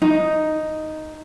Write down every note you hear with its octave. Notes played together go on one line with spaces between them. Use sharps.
D#4